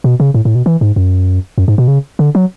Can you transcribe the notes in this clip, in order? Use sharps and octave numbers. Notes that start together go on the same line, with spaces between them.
B2
C#3
A2
A2
B2
E3
G#2
F#2
F#2
G#2
B2
C#3
D3
F#3